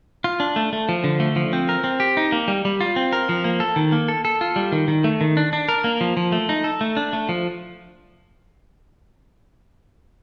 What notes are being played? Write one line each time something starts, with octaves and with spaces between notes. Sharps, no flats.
F4
D4
A3
A3
F3
D3
A3
F3
C4
A#4
C4
G4
D#4
A#3
G3
G3
F4
C4
A#4
F3
A#3
A4
D#3
A#3
A4
A4
F4
G3
D#3
D#3
A3
D#3
D4
D4
A#4
A#3
F3
F3
A3
D#4
A4
A3
D4
A3
F3